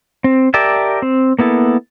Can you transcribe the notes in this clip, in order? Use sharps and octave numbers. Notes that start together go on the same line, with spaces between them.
C4
G4 A#4 D5 E5 A5
C4
A#3 B3 E4 A4